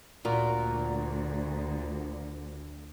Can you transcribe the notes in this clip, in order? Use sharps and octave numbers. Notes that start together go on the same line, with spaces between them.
D2 A#2 F4 F#4 A#4